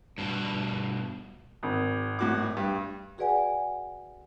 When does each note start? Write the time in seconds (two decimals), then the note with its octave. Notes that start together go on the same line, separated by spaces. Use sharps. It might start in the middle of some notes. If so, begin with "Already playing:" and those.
0.18 G2 B2
1.63 G#1
2.19 A2 F#4 D6
2.57 G2
3.18 F#4 G#4 B4 D5 F#5 G#5